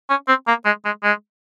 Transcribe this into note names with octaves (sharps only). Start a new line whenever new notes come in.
C#4
C4
A#3
G#3
G#3
G#3